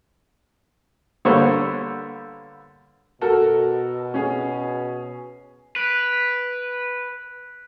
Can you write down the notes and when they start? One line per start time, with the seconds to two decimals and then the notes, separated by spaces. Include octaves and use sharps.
1.25 D3 G3 A#3 B3 C5 C#5
3.21 B2 F#4 A4 A#4
4.14 C#4 G#4
5.76 B4 F#6 D7 F7
6.13 B6